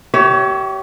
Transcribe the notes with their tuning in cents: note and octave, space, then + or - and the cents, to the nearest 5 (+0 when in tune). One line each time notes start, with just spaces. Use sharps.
G4 -30 C#5 +20 E5 +0